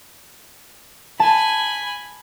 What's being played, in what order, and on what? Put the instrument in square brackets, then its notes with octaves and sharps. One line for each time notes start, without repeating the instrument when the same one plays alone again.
[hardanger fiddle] G#5 B5 [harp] A5